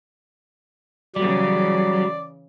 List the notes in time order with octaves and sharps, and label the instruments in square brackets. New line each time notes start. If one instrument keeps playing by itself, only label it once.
[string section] C#3 E3 [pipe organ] F#3 [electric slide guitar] G3 [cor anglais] D5